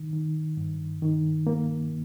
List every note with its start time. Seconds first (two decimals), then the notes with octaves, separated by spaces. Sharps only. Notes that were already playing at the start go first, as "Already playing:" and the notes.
Already playing: D#3
0.13 D#3
0.57 G2
1.02 D#3
1.47 A#3